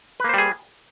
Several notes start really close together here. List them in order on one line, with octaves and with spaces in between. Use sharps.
B4 A#3 C5 G3 G#4